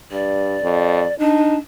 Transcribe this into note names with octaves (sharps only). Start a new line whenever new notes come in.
G2 D5
F2
D4 D#4